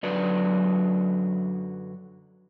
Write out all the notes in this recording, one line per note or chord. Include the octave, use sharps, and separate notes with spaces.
F#2 D3 F#3 B4 D5